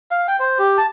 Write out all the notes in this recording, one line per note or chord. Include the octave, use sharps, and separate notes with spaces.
F5
G5
C5
G4
A5